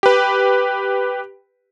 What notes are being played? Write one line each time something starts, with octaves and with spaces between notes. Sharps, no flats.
G4 B4